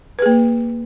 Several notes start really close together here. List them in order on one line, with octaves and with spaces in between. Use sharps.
B4 G#4 A#3